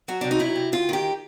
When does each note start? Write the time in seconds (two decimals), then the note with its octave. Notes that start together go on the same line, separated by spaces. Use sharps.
0.08 F#3 F#4
0.21 C3 D4
0.31 D#4
0.39 F#3 E4
0.56 C3
0.72 D2 F4
0.89 D#3 G4